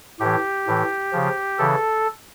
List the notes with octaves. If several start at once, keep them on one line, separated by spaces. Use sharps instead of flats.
A2 E3 G4
A2 E3
C#3 F3
C#3 E3 A4